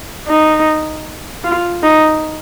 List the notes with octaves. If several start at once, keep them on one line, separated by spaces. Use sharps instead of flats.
D#4
F4
D#4